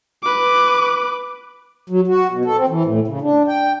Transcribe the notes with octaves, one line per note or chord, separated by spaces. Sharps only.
B4 D6
F#3
F#4
B2
A4
C4
E3
A2
C#3
D4
G5